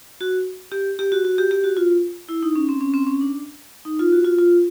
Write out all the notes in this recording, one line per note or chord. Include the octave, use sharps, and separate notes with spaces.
F#4
G4
G4
F#4
F#4
G4
G4
F#4
F4
E4
D#4
C#4
C4
C#4
C4
C#4
D4
D#4
F4
F#4
F4
F4